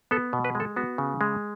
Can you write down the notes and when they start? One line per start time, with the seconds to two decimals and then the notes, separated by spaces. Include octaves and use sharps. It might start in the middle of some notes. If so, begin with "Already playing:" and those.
0.11 B3 A4
0.33 B2
0.45 B4
0.55 G#3 A4
0.76 B3 F#4
0.98 C#3
1.21 G#3